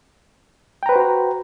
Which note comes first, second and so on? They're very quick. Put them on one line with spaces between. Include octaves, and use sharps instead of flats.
G5 A#5 B4 C5 F#4